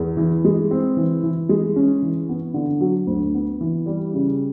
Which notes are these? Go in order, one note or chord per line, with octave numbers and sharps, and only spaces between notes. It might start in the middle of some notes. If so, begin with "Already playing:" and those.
Already playing: E2
E3
G#3
C4
E3
E3
G#3
C#4
E3
B3
D3
F#3
D2
B3
E3
G3
C#3